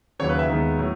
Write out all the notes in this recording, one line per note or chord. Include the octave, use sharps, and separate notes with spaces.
D#2 C#3 F#3 C#5
B4
E5
D#2 D#3 G#3 B3
A2 F#3